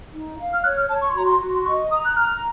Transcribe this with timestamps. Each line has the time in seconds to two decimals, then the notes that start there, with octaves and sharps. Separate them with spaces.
0.13 D#4
0.39 F5
0.53 F6
0.63 C#5 F#6
0.77 F6
0.89 C#5 A5
1.01 C#6
1.10 C6
1.14 F#4 A#5
1.26 C6
1.40 F#4
1.55 C6
1.66 D#5 C#6
1.91 A#5 D#6
2.05 F#6
2.16 A#5 F6